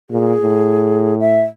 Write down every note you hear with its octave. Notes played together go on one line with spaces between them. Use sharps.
A#2 G#4
A2
E5